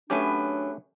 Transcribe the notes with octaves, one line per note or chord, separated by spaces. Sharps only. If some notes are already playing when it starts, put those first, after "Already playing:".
F#2 F#3 A3 C#4 D4 G4 B4